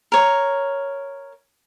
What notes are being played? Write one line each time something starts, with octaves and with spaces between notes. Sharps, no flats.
A#4 C#5